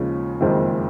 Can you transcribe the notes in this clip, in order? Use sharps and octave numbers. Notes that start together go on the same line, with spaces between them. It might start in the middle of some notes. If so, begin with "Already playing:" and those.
Already playing: D#2 C#3 F3 G#3 C#4
F#1 F2 D#3 G#3 C4